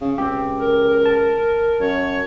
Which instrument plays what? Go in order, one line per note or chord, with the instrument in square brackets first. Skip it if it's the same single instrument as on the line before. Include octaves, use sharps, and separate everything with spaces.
[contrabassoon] C#3
[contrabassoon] C#2 [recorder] C4 [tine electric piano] G4
[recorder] A#4
[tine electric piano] A5
[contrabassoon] F#2 [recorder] C#5